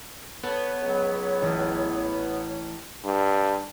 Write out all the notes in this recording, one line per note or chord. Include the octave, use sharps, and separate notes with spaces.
B3 A4 C#5
C#2 F#3
A1
G2